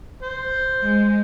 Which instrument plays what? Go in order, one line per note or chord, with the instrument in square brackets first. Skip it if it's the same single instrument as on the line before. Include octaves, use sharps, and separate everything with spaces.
[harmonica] C5
[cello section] G#3